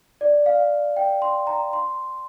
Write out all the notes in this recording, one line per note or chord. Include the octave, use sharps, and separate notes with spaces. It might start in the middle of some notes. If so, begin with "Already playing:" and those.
D5
F5
G5
C6
A#5
C6